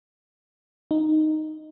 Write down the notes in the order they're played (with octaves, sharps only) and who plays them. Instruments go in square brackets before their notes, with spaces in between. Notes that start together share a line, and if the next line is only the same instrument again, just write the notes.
[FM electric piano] D#4